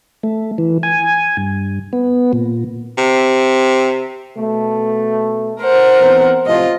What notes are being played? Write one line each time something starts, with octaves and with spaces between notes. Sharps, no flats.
A3
E3
G#5
G2
B3
A#2
C3
B2 A3
A#4 C5 F#5
E3 B3 C4
A2 C3 F3 F4 D#5